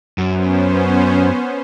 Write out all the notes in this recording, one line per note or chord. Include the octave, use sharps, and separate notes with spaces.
F#2 B3 C#4 C5